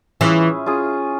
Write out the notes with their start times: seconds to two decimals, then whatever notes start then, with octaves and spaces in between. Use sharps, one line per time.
0.21 E3 C#4 F4 G#4
0.66 C#4 F4 G#4